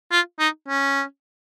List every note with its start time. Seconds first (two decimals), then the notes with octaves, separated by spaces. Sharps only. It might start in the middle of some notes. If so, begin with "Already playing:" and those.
0.12 F4
0.40 D#4
0.69 C#4